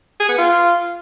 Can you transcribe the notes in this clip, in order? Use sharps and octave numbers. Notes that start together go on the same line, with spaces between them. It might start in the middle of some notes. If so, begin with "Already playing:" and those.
G#4
B3
F4